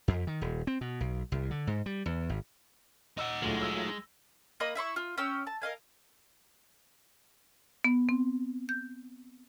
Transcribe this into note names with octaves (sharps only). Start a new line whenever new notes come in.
F2
D#3
D#1
C4
B2
B1
C2
D3
G#2
G3
E2
G#1
D#4 D#5 F#5 E6
D2 A2 F#3 G#3 A3 F4
E6
A#3 D#5 B5 D#6
E4 E5 C6 C#6
F4
C#4 G5 E6
A5
A#4 D#5 F5 G#5
B3
C4
G6